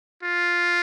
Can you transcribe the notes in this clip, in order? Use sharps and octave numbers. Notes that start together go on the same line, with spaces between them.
F4